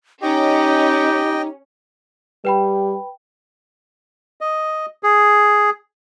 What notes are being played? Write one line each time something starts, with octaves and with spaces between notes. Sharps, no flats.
C#4 D#4 G4 D#5 G5
G3 B4 G5 B5
D#5
G#4